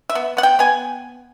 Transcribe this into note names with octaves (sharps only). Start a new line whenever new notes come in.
E5
B3
B3 F#5
G5
B3 G#5